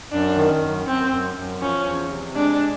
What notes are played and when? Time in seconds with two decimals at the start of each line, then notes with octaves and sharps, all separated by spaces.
0.12 F#2 D4
0.36 D#3
0.62 F#2
0.87 F#2 C4
1.11 F#2
1.36 F#2
1.61 F3 C#4
1.85 E2
2.11 C3
2.35 G#3 D4